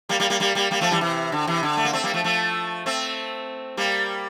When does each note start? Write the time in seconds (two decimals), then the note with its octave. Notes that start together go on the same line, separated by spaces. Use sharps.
0.09 G3 A#3
0.20 G3 A#3
0.30 G3 A#3
0.40 G3 A#3
0.55 G3 A#3
0.71 G3 A#3
0.81 F3 A3
0.91 E3 G3
1.01 C3 E3
1.32 D3
1.47 C3 E3
1.63 D3
1.77 A3
1.85 A#3
1.93 A3 C4
2.03 G3 A#3
2.14 F3 A3
2.24 F3 A3
2.86 A3 C4
3.77 G3 A#3